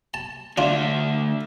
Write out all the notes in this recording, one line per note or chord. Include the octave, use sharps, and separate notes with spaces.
A5
D2 D4 F4 E5